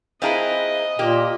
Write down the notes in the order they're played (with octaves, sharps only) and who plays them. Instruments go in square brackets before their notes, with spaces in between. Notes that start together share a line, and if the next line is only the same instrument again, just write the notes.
[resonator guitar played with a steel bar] C4 E4 G#4 [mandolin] F4 A#4 B4 [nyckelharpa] D#5
[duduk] A#2 [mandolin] A#3 [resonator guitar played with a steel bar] G4